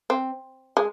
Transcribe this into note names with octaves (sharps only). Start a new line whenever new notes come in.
C4
G#3